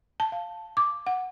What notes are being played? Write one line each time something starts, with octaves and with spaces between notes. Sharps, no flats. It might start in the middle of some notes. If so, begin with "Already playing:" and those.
A5
F5
D6
F#5